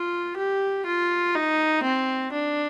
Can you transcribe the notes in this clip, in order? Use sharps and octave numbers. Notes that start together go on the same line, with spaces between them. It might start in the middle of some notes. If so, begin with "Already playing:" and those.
Already playing: F4
G4
F4
D#4
C4
D4